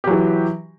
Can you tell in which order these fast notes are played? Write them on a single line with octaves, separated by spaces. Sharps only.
G4 F#3 E3